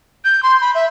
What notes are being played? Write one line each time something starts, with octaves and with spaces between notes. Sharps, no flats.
G6
C6
B5
E5